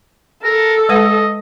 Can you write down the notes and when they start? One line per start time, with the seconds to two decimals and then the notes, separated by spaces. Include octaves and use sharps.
0.44 A4 A#4
0.89 G#3 B4 D#5 F#5